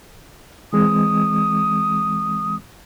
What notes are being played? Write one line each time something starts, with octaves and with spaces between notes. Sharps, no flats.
E3 G#3 C4 D#6